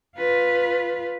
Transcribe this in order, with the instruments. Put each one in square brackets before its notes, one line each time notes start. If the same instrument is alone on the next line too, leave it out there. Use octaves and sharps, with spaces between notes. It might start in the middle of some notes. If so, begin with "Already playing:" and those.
[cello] F4 B4